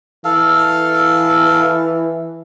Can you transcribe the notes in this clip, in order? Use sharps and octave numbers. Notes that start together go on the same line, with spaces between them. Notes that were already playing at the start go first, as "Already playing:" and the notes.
E3 A4 F5